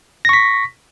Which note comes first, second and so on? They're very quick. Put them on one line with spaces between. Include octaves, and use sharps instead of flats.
A#6 C#6 B6